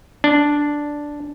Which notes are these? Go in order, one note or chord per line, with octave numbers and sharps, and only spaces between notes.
D4